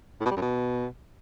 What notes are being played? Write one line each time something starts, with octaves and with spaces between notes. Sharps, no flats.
A2
B2
G3
F#2
B2